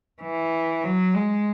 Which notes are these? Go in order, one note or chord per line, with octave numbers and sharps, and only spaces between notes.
E3
F#3
G#3